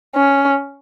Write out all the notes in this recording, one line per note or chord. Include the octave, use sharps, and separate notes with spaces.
C#4